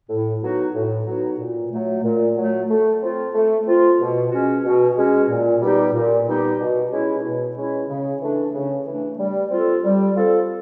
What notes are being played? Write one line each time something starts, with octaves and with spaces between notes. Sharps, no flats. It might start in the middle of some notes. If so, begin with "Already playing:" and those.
A2
F#3 B3 D#4 F#4
A2
F#3 B3 D#4 F#4
A#2
F#3 A3
A#2
F#3 A3
A3
C4 F4
A3
C4 F4
B2
G#3 C#4 F#4
B2
G#3 C#4 F#4
A#2
G3 B3 D#4 G4
A#2
G3 B3 D#4 G4
B2
G#3 C#4 E4
B2
G#3 C#4 E4
C#3
E3 A3 D4
C#3
E3 A3 D4
G3
C4 F4 A4
G3
C4 F4 A4